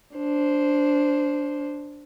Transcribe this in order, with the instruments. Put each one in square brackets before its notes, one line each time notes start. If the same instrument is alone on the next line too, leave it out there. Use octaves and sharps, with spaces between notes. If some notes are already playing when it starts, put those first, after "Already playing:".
[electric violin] D4 C5